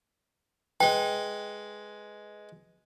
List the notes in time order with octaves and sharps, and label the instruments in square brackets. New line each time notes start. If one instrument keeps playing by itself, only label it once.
[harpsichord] G#3 B4 [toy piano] G5